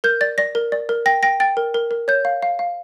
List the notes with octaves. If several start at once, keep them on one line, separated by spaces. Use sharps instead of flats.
A#4 G6
D5 A6
D5 A#6
A#4
D5
A#4
G5 A#6
G5 A#6
G5 A6
A#4
A#4
A#4
C#5 G6
F5
F5
F5